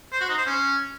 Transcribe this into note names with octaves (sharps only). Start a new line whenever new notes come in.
C5
F#4
D#4
C5
C#4